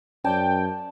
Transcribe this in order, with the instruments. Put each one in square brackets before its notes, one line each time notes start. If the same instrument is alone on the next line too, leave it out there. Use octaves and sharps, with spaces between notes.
[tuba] F#2 [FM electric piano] C#4 C5 D5 [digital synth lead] G5 [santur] A5